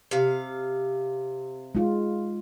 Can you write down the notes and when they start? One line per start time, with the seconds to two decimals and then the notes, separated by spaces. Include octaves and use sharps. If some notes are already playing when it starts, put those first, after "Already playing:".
0.11 C3 F5
1.75 G#3 F4